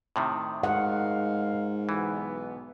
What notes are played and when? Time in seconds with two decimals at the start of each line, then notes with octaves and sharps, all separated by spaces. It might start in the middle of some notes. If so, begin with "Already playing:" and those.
0.16 A2 C3 D#3
0.63 G#2 D#4 A#4 F5 F#5
1.89 B1 E3 B3